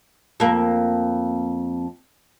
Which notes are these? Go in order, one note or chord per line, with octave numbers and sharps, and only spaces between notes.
F2 A#3